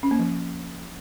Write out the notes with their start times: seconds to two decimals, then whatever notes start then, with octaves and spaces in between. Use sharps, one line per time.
0.03 C#4
0.11 A#3
0.19 F3